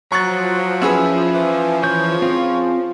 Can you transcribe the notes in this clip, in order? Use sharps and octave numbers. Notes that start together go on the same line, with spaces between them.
F3 F#3 A#5 C#6 F#6 A6
C#4 E4 G#4 B4 E6
E3
E3 C#5 G6
C4 F4 F5